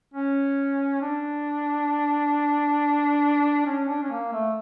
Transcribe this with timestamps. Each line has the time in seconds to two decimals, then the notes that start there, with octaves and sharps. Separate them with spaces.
0.14 C#4
1.02 D4
3.66 C#4
3.88 D4
4.02 C#4
4.11 A#3
4.33 A3